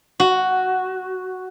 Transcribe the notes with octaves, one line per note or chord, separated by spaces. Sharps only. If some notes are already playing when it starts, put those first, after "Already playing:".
F#4